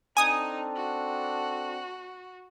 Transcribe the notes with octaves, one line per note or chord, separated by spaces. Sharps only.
C4 D4 D#4 A4 G#5 D#6
F#4